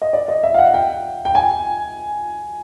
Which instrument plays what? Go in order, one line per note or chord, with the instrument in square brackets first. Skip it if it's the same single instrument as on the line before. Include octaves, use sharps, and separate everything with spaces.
[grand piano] D#5
D5
D#5
E5
F5
F#5
G5
G5
G#5